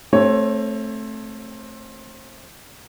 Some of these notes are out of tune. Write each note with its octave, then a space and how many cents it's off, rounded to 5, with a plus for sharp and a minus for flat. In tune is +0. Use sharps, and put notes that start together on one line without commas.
A3 +0 C4 +25 C#5 +0